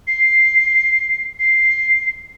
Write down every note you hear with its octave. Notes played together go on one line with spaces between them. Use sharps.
C7
C7